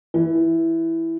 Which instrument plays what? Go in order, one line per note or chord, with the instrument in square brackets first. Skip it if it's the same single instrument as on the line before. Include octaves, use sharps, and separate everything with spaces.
[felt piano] E3